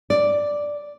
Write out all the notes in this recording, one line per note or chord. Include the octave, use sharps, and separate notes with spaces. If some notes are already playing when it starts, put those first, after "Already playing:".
D5